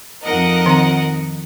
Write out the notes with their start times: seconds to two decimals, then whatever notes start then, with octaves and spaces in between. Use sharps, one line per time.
0.23 F2 D#4 A#4 D#5 F#5
0.66 D#3 C4 A#5